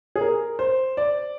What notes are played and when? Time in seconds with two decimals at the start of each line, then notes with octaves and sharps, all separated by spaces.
0.16 G#4
0.21 A#4
0.59 C5
0.97 D5